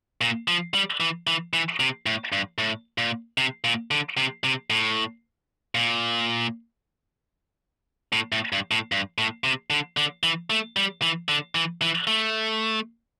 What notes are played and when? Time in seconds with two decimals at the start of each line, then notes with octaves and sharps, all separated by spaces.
0.21 A#2
0.48 F3
0.74 G3
1.00 E3
1.27 E3
1.53 E3
1.80 C3
2.06 A2
2.32 G2
2.58 A2
2.98 A#2
3.38 C3
3.64 A#2
3.91 D3
4.17 C3
4.44 C3
4.70 A2
5.75 A#2
8.13 A2
8.32 A2
8.52 G2
8.71 A2
8.92 G2
9.18 A2
9.44 C3
9.70 D3
9.97 D3
10.23 E3
10.50 A3
10.77 G3
11.02 E3
11.29 D3
11.55 E3
11.82 E3
12.07 A3